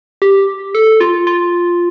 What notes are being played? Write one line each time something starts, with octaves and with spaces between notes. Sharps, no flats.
G4
A4
F4
F4